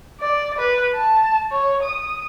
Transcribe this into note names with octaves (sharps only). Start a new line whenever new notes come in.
D5
B4
A5
C#5
D#6